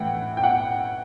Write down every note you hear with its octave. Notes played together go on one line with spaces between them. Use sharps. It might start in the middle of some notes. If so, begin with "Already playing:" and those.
Already playing: A2 E3 A3 F#5 G5
G5
F#5